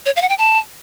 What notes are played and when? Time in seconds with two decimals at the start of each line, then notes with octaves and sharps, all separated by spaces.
0.06 C#5
0.16 F5
0.22 F#5
0.29 G5
0.38 A5